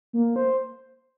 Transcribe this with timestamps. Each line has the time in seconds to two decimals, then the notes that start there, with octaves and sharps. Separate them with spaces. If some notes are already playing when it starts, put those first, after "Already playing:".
0.13 A#3
0.36 C5